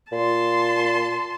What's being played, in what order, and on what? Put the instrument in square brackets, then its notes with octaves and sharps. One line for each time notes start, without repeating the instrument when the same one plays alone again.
[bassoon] A#2 [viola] A5 C6